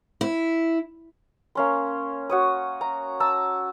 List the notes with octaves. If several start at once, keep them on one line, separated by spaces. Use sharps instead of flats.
E4
A#3 C#4 C6
F#4 C#5 D#6
A#5
A5 A#5 E6